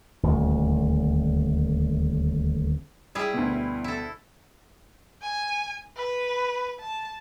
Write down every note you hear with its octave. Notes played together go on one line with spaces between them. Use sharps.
D#1 D2
G3 G#3 E4 G#4
D2 B2
E4 A4
G#5
B4
A5